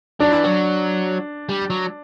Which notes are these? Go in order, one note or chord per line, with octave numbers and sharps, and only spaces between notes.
F#3 D4
E3
F#3
G3
F#3